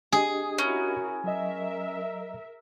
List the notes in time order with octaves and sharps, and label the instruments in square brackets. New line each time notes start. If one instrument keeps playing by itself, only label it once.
[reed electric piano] D4 G4 D#5 [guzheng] G#4
[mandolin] C#4 [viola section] E4 F#4 A#4
[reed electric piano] F#3 D#5 [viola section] A#4 E5